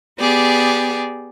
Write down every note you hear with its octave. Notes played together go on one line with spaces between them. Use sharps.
B3 G4 G#4 D5